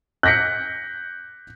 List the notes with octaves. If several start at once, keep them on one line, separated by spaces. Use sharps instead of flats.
F#6 G6 A#6 B6 C#7